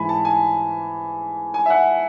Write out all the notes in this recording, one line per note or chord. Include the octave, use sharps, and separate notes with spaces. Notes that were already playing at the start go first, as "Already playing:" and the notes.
Already playing: G#2 E3 G#5 B5
A5
G#5
G#5
E5
F#5